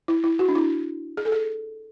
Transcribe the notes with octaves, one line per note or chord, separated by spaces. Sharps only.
E4
E4
F#4
D4
E4
G#4
A4
G#4